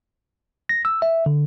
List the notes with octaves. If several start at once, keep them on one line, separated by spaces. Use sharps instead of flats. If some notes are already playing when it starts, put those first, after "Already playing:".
A#6
E6
E5
D3